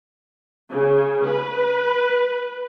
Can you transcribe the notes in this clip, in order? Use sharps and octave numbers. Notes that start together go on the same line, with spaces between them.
C#3
B4